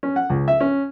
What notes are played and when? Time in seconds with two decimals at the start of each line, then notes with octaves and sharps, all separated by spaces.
0.03 C#4
0.16 F#5
0.30 C#2
0.48 E5
0.61 C#4